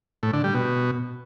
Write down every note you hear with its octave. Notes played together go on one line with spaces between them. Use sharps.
A2
D3
G3
B2